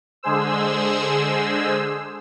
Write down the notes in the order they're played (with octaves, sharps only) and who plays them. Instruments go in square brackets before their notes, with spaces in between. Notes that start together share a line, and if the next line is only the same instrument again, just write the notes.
[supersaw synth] D3 G#3 G#4 C5 E6